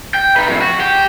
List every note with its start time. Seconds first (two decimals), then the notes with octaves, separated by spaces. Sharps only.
0.14 G5
0.36 D#4 B4
0.49 F2 A2
0.61 F#4
0.80 G4